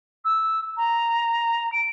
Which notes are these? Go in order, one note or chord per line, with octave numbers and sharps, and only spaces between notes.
E6
A#5
D7